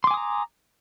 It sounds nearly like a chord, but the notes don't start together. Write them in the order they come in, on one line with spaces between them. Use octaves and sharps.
C6 D6 G#5 D#6 A#5